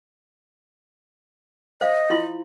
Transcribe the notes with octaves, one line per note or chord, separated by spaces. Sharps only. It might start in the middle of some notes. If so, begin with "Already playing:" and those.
C5 D#5 F5
E4 F4 C6